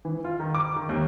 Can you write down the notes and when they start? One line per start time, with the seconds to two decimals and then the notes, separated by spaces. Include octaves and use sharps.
0.05 E3
0.24 F4
0.40 D#3
0.55 D6
0.76 D#3
0.89 D#2